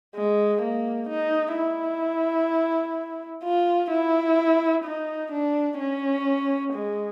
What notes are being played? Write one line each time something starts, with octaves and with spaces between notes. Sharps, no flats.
G#3
A#3
D#4
E4
F4
E4
D#4
D4
C#4
G#3